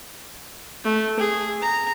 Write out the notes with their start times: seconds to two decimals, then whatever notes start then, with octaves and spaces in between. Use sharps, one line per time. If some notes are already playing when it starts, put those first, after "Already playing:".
0.84 A3
1.19 G#4
1.62 A#5